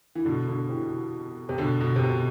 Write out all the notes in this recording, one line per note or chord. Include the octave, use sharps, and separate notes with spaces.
E3
B2 D3
B2 D3
C3 E3
C3
B2 D3
B2
C3
B2